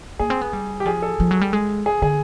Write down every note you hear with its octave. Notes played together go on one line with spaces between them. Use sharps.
A#3 G#4
C4
B3
G3
G4
F3 G#4
A4
F3
F#3
G3
G#3
G#4
D3 G#4